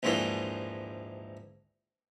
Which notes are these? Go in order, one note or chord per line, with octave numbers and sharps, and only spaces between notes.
A#1 D#2 G#2 E3 D4